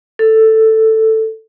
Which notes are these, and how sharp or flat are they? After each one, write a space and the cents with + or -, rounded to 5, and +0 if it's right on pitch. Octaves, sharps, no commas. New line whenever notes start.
A4 +5